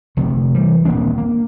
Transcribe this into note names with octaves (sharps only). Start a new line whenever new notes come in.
F1 D2 C3 A3
E3 G3
D#1 A#3 C4 D4
A#3